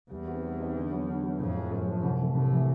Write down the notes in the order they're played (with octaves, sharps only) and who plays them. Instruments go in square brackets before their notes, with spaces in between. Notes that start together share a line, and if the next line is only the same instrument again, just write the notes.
[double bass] E2 [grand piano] G3
[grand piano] C4 D#4 F#4 B4
G3
C4 D#4 F#4 B4
D3
F#3 B3
D3
F#3 B3
[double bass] F2 [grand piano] A2
[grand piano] F3 G#3
[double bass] F#2 [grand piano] A2
[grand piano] F3 G#3
C2
C3 E3 A3
[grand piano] C2 [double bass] A2
[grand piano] C3 E3 A3